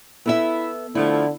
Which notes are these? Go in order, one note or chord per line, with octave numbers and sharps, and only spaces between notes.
B3 E4 A4 E5
D3 F3 A3 E4